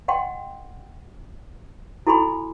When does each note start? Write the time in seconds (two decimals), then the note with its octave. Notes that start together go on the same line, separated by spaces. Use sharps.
0.08 D#5 F#5 G5 C6
2.07 E4 F#4 A4 G#5 B5 C6